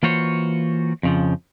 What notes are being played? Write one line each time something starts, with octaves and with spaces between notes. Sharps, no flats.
E3 A#3 F4 F#4 C5 C#5
F2 C#3 F3